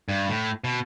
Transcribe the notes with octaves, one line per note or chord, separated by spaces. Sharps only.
G2
A2
B2